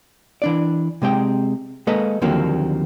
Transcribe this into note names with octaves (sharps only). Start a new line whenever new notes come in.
E3 D4 D5
C3 G#3 C4 G5
G#3 A#3 A4 B4 D#5
D#2 D3 F3 F#3 A#3 C4